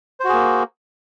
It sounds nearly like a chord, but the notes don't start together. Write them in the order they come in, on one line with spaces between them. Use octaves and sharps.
C5 F#4 G#4 A#3